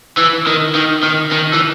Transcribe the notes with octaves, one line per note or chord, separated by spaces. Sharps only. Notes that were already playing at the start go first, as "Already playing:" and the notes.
E3
D#3
D#3
D#3
D#3
E3